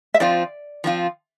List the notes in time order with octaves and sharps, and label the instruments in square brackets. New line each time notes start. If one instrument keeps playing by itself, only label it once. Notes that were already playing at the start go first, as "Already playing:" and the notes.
[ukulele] E5
[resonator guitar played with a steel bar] F3 C4 F4 [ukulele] D5
[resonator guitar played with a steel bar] F3 C4 F4